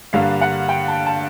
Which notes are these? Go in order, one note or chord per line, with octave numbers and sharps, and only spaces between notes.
G2 D3 G3 A#3 F5
F#5
G5
A5
A5